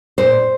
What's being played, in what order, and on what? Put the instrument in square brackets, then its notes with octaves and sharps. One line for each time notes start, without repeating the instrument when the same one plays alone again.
[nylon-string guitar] A#2 C5